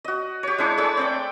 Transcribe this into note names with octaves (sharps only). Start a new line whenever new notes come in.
F#4 D#5
G4 C#5
G#3 D4 E4 C#5
G#3 A3 C#5 E6
C4 D5 G5